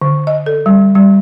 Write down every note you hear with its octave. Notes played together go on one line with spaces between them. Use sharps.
D3
D#5
A4
G3
G3